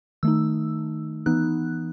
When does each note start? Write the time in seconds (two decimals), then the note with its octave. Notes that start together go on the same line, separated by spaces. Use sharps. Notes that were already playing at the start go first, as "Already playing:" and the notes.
0.23 D#3 A3 D#4 E6
1.26 E3 B3 D#4 F#6